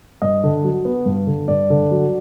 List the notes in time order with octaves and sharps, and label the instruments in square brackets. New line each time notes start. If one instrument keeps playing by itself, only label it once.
[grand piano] G2 D#5
D3
F#3
B3
G2
D3
G2 D5
D3
F#3